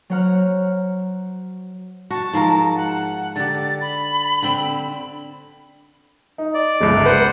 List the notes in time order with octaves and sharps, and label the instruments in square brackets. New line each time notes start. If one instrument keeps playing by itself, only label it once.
[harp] F#3 F#4 C5 F#5 A#5 F6
[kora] F#4 [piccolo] A5
[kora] G#2 F3 A#4
[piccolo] F#5
[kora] D3 G4 [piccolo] A6
[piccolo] B5
[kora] D3 C4
[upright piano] D#4
[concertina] D5
[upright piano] G1 C#2
[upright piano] B4 [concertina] C5 F#5